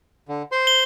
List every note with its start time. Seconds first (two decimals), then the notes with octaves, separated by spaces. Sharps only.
0.28 D3
0.52 C5 C6
0.67 G7